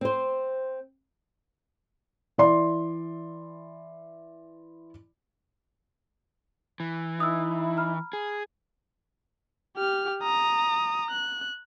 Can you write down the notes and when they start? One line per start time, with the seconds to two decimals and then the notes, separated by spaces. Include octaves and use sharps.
0.01 C4 C5
2.38 E3 D5 C6
6.80 E3
7.20 D#4 E4 D#6 E6
7.77 A#5 B5 F6
8.13 G#4
9.77 G4 F6
10.23 A#5 D#6
11.10 F#6